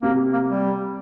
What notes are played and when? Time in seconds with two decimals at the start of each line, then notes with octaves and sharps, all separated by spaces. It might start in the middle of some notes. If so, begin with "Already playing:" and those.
0.02 C3 A#3
0.33 A#3
0.48 G3